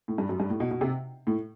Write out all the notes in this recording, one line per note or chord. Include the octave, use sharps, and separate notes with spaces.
A2
G2
F#2
G2
A2
B2
B2
C3
A2